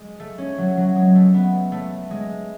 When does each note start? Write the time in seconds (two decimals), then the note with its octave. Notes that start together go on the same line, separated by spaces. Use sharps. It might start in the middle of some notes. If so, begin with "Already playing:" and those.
Already playing: G#3
0.20 A3
0.38 C#4
0.58 F#3
0.77 F#3
0.96 G#3
1.15 A3
1.34 B3
1.72 A3
2.11 G#3